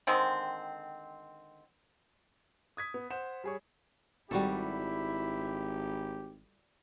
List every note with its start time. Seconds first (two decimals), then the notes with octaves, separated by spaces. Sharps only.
0.07 D3 D#3 G#3 C4
2.77 D#6 G#6 B6
2.94 B3
3.11 C5 F#5 E7
3.44 G3 G#4 C#5
4.31 G#1 G3 E4 F#4 G4 A4